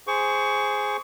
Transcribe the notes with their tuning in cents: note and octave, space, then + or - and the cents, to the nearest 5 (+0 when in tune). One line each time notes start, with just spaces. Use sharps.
G#4 +0 C5 +0 C#6 +20